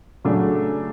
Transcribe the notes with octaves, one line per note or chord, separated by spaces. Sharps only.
C#3 F#3 A3 D4